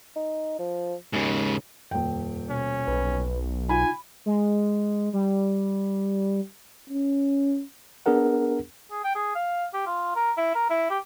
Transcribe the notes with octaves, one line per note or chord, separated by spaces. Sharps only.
D#4
F3
D#2 G#2 C#3
D#1 F2 G5
B2 C#4
B1 B4
D#4 F4 G#5 B5
G#3
G3
C#4
B3 D4 G#4 A#4 F#5
G#4
G5
G#4
F5
G4
F4
A#4
E4
A#4
E4
G4